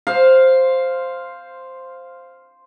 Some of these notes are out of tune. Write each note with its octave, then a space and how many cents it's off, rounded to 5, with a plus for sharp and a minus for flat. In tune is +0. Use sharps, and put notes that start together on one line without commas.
C5 +0 F5 +0